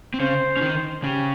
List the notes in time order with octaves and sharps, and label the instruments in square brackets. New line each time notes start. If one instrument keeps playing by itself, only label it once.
[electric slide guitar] C4
[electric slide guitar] C#3 C#4 [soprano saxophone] C5
[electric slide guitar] C#4
D#3 D#4
[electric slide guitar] C#3 C#4 [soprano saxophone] G4